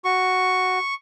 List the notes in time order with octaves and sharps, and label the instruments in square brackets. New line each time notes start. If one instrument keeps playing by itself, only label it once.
[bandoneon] F#4 [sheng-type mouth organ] C#6